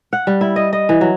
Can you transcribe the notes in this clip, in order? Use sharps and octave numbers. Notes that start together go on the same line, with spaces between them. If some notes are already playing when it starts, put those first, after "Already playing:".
F#5
G3
E4
D#5
D#5
E3
F#3